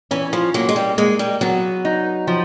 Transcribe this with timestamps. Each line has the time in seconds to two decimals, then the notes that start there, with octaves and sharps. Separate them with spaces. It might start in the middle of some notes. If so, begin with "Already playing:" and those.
0.11 E3 C#4
0.33 F3
0.54 F#3 A#3
0.69 G#3
0.76 G3
0.98 G#3 A#3
1.19 G3
1.41 F#3 B3
1.85 D#4
2.27 F3